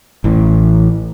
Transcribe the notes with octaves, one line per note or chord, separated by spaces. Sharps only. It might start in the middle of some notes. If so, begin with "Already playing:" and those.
A1 E3